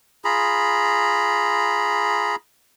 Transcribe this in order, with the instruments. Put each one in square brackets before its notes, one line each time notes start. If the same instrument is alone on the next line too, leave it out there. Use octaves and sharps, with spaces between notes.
[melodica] F4 G#4 A#5 B5